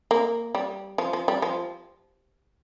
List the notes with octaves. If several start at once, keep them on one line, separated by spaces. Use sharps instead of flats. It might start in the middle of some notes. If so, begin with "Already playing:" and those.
A#3
G3
F3
F3
G3
F3